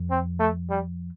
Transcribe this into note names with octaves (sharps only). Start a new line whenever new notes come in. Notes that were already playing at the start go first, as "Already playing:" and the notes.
Already playing: F2
C4
A3
G3